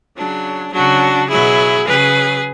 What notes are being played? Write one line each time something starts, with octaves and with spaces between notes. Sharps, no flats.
C#3 F#3 D4
C#3 F#3 D4 F#4
B2 F#3 E4 G#4
C#3 F#3 G#4 B4